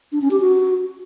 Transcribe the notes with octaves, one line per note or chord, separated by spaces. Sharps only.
D4
C#4
G4
F#4